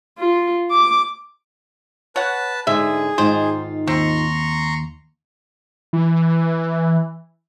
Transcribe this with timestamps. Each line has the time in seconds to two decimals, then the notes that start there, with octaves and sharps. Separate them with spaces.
0.19 F4
0.71 D6
2.16 B4 C#5 F#5 A5
2.67 G#2 D3 G#4 E5
3.18 G#2 D#3 F4 C5
3.87 D#2 C4 A#5 C6 C#6
5.93 E3